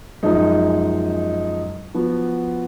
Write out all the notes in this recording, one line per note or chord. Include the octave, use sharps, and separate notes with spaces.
F#2 F3 G#3 D#4
F3 B3 F#4